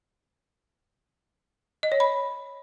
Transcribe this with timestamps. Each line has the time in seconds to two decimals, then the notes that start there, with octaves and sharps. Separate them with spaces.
1.83 D#5
1.92 C#5
2.00 B5